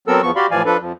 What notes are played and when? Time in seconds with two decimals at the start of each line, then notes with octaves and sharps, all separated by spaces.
0.08 F#3 B3 C4 A4 A#4 E6
0.23 E2 F3 B3 C#6
0.36 F#4 G4 D5 F5 B5 C6
0.51 A2 E3 F3 D5 F5 G#5
0.65 F3 D4 A4 B4
0.80 F2 F3